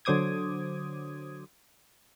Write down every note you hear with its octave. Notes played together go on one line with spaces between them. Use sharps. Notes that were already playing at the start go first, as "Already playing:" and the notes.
D3 F#3 C5 D6 D#6 G#6